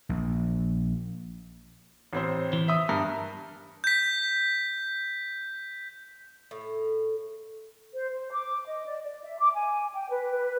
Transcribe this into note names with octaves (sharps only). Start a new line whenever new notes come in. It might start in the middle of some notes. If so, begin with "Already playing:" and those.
A#1
A1 C4 C5
E3
E5 D#6
G2 A#4
G6 B6
A2
C5
C5
D6
D#5
D5
D5
E5
D6
G#5
G5
B4
B4